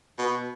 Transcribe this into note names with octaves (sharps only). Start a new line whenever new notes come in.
B2